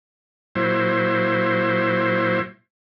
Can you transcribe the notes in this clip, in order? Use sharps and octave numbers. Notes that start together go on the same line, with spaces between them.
A#2 F#3 E4 C5